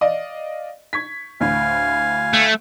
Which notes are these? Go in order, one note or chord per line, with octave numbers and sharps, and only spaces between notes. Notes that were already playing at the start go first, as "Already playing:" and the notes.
D5 D#5 F5
C#6 G#6 B6
D2 A2 F5 G#5
A3